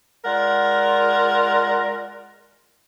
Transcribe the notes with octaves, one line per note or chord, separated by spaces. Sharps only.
G#3 F4 A#4 D5 F#5